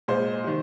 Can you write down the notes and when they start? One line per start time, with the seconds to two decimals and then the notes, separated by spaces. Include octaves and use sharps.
0.08 A#2 G#3 C5
0.44 C3 D#3